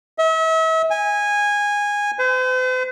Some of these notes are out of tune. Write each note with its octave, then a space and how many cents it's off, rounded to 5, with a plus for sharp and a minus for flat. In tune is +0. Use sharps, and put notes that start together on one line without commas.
E5 -40
G#5 -15
C5 -45